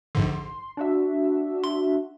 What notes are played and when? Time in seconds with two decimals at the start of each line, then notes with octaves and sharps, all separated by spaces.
0.15 A#1 G#2 D3 C6
0.77 D4 F#4 E5
1.64 C6